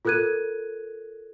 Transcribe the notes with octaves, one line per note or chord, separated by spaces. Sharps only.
F4 A4 A#4 F#6 G#6 D#7